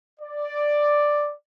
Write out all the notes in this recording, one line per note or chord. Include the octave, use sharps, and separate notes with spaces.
D5